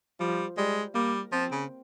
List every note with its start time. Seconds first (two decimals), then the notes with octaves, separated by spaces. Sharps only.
0.20 F3 G3
0.57 G3 G#3
0.94 G3 A#3
1.32 F3 C4
1.51 C#3